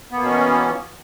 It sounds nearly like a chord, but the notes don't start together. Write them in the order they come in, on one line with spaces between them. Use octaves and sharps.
B3 A#3 B2 C#4 E3